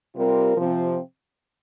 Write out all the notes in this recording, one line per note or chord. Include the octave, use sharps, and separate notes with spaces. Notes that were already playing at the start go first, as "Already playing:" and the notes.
C3 G3 C4 F4 A#4
C3 F3 C4